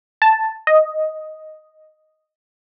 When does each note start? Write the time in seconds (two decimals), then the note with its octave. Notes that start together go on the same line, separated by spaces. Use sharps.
0.22 A5
0.67 D#5